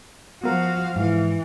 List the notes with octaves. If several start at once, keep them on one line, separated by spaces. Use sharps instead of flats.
F3 B3 F#4 A#4 F5
G#2 E3